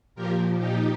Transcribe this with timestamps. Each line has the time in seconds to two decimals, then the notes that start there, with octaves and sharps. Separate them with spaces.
0.15 A#2 F3 G4 A#4
0.57 D#4 G4